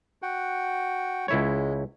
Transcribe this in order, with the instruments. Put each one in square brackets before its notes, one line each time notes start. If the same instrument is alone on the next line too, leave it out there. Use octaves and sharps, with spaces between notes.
[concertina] F#4 F#5 G5
[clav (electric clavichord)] C#2 E4 C#5 [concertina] G#3